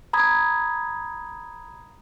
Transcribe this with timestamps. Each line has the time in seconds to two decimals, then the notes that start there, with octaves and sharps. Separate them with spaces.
0.13 A#5 B5 D#6 G#6